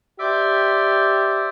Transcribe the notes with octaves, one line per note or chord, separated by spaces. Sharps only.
G4 C5 D5 E5